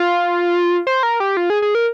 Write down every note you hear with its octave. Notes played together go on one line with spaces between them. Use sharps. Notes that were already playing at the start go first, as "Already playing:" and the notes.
Already playing: F4
C5
A#4
G4
F4
G#4
G#4
A#4